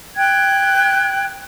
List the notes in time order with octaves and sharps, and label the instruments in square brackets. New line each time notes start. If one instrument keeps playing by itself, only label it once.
[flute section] G5 F#6 G#6